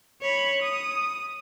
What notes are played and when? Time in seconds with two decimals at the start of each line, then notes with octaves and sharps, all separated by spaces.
0.22 C#5 B5
0.62 D#6